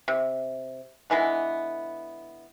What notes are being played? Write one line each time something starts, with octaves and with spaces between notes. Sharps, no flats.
C3
D3 E3 G#3 B3